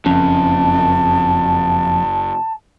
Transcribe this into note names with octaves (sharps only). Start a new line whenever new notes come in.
F#1 F2 C#4 A5